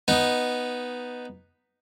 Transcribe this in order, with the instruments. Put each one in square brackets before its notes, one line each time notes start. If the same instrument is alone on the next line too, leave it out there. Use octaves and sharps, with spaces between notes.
[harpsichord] B3 D#4